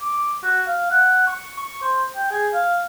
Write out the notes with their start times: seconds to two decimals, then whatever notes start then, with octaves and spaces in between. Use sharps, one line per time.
0.02 D6
0.43 F#4
0.67 F5
0.91 F#5
1.27 C#6
1.59 C#6
1.82 C5
2.16 G5
2.31 G#4
2.54 F5